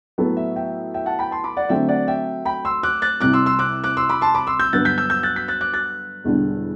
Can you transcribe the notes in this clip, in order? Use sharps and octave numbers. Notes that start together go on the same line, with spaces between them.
A2 F#3 B3 E4 A4
E5
E5 G5
E5 G5
F#5 A5
G5 B5
A5 C6
B5 D6
D5 F#5
D3 F#3 A3 C4 E5 G5
D5 F#5
E5 G5
G5 B5
C6 E6
D6 F#6
F#6 A6
C2 C3 G3 D6 F#6
C6 E6
C6 E6
D6 F#6
D6 F#6
C6 E6
B5 D6
A5 C6
B5 D6
C6 E6
E6 G6
G2 D3 F#3 B3 F#6 A6
G6 B6
E6 G6
E6 G6
F#6 A6
G6 B6
F#6 A6
D6 F#6
F#6 A6
E1 E2 D3 G3 D4